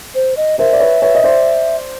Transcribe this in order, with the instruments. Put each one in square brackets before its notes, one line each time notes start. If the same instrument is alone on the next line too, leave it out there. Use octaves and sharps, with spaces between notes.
[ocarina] C5
D#5
[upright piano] A#4 C5 [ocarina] E5
[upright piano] D5
B4 C#5
B4 C#5
D#5
C5 D5